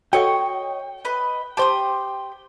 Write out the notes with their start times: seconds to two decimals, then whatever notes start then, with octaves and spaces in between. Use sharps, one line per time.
0.13 F#4 A4 C#5 D#5 F#5 G5
1.05 B4 D#5
1.57 G4 C5 A5 C6 D#6